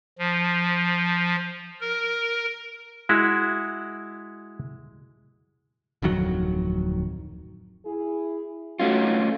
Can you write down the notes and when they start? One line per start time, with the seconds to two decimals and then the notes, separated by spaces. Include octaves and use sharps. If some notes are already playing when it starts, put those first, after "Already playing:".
0.19 F3
1.81 A#4
3.09 G#3 E4 F#4
6.02 D1 F2 D#3 F#3
7.86 E4 G#4
8.80 A3 C#4 D#4 F4 F#4